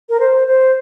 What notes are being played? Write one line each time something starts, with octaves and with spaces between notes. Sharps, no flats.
A#4
C5
C5